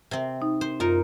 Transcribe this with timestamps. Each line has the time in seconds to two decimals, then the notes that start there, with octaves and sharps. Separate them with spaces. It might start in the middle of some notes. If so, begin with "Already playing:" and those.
0.11 C3 C4
0.42 D#4
0.61 C5
0.80 F#2 D#4 F4 A#4